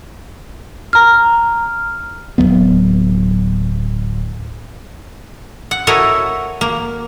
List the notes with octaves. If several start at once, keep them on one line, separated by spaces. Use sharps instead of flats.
A#5 F6
D1 C#2 F#3 B3
F#5
E4 F#4 A4 A#4 C#5 D#5
A#3